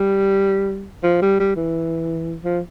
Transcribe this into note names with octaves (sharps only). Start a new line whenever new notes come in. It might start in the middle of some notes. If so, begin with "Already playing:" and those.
Already playing: G3
F3
G3
G3
E3
F3